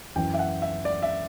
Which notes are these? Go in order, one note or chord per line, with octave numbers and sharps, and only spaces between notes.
F#2 E3 G5
E5
F#5
E5
D5
E5